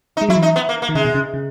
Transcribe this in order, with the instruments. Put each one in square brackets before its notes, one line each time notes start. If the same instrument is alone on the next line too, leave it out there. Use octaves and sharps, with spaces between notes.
[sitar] D#4
[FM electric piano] G#3
[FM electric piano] F#3 [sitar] E4
[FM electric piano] E3
[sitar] D#4
B3
A#3
A#3
[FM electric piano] D#3
[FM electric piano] C#3 [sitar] G#3
[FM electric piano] B2
C#3
C#3